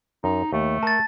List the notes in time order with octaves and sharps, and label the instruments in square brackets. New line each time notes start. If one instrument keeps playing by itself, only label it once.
[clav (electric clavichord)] F#2 [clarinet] D#4
[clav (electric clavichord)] D#2 [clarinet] A3
[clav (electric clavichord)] A#4 [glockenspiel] A5 A6